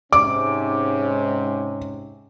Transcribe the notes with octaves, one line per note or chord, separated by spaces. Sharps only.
G#2 C3 C#4 D6